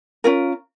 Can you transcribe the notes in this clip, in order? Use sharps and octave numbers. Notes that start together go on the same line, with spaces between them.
C#4 F4 A#4